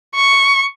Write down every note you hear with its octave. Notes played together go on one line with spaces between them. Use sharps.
C#6